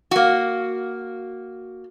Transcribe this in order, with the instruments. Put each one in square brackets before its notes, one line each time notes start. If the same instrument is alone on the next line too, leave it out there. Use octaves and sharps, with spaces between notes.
[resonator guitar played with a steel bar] A#3 F#4